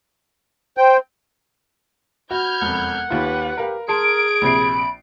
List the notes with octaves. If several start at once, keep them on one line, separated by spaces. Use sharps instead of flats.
C5 G5
F#4 B5 F6 G6 G#6
E1 F2 F#5
D#2 F4 G4 B4
G4 A#4 F5
G#4 A#4 A5 C6 D7
A#1 C3 B5 C7